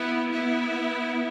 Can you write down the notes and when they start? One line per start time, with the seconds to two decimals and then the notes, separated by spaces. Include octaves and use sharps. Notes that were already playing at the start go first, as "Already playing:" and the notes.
Already playing: B3 E4
0.32 B3 E4